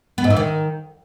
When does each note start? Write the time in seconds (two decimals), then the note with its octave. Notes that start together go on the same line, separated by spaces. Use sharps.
0.18 B3
0.24 G#2
0.30 E3
0.37 D#3